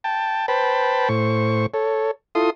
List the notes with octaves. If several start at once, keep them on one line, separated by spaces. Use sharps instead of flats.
G5 A5
B4 C5 G5 A5 B5
A2 C5 C#6
A4 C#5
E4 F4 A4 C6 D#6